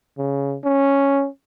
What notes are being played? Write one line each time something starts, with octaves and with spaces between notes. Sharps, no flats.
C#3
C#4